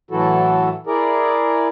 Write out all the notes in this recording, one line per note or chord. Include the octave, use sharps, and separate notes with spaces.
A2 E3 F#3 E4 F#4 A4
E4 G#4 A#4 D5